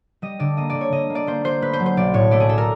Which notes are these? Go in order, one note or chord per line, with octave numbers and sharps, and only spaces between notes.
G3 D#5
D3 D5
A#3 D#5
D5
D3
C#5
D3 D#5
A#3
D5
A#3 C5
A#3 C5
A3 B4
C5
F#3
C5
B1 D5
A2 C#5
A3 D5
G#4
A3 A4
A#4